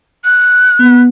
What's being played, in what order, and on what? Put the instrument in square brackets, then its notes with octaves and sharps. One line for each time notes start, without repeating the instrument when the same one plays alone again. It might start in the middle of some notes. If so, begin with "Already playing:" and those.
[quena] F#6
[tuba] B3